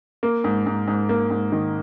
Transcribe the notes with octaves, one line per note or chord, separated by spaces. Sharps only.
A#3
G#2
G#2
G#2
A#3
G#2
D#3